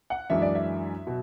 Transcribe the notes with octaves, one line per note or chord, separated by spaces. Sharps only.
F#5
F#2 E3 G#3 D4 E5
D5
E5
B2 F#3